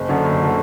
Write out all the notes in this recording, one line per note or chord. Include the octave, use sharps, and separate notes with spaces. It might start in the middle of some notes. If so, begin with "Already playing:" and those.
Already playing: F#1
F#2 D3
F#1
D3